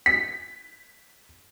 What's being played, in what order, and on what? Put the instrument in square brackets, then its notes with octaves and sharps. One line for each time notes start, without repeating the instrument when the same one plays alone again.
[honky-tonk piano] B6